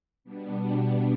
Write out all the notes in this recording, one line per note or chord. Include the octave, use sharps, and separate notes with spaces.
B2 G3 B3 D4